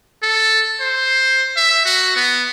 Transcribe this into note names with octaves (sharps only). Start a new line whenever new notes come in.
A4
C5
E5
F#4
B3